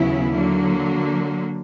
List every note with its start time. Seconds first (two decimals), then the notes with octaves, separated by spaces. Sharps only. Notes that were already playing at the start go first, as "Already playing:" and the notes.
Already playing: D#2 C#3 F#3 B3 E4
0.35 D3 F#3 A#3